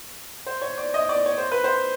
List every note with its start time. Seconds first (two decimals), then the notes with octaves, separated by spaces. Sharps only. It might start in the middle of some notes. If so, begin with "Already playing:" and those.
0.46 C5
0.62 C#5
0.77 D5
0.94 D#5
1.09 D5
1.26 C#5
1.38 C5
1.52 B4
1.64 C5